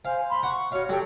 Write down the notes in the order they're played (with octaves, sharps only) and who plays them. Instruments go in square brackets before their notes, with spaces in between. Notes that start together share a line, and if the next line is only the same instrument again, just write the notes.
[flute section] C5 G#5 [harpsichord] F5
[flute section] B5 C6
[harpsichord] F#5 [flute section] C#6
[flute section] F#4 C#5 F6 [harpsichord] F5 C#6
[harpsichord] F#3 [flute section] G4 A4 G5